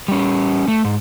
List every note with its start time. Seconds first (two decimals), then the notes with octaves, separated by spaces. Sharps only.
0.08 G3 C#4
0.68 A3
0.84 G#2